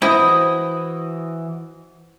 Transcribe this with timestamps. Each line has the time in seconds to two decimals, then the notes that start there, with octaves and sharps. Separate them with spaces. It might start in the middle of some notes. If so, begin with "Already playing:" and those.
0.02 E3 E4 F#4 C5 D#5 D#6